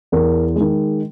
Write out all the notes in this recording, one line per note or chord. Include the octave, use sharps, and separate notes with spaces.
E2 A#4
D#3 G#3